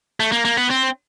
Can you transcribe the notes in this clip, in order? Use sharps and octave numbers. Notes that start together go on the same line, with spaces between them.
A3
A#3
A#3
B3
C4